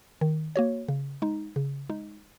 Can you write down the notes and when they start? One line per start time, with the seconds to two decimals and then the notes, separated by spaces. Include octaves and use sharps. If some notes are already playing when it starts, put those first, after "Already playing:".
0.21 D#3
0.56 A#3 F#4 C#5
0.89 C#3
1.22 G#3 D#4
1.56 C#3
1.90 G#3 D#4